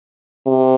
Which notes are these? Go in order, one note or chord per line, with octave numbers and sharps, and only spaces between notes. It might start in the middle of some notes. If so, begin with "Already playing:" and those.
C3